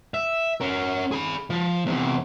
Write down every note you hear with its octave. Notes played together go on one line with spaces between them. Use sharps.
E5
C#4 A#4
G#4 B5
F3
E2 C3